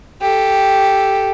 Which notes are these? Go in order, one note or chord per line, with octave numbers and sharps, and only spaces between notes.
G4 A4